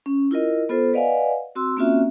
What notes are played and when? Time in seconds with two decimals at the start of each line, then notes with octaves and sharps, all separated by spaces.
0.06 C#4
0.31 E4 F4 A#4 D#5
0.69 B3 F4 A4 C5
0.93 B4 D5 D#5 F5 F#5 G#5
1.55 C4 F#4 C6 E6
1.77 A#3 C4 C#4 F4 F#4 E5